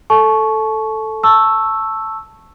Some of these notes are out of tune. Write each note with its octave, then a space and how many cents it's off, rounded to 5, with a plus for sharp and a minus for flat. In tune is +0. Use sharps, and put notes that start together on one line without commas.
A4 +0 A5 -35 C#6 +0
A5 +5 C#6 -10 E6 +0